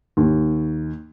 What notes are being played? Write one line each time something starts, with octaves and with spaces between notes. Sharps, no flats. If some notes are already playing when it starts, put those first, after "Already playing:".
D#2